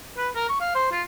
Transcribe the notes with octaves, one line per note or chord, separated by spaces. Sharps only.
B4
A#4
C#6
F5
C5
F4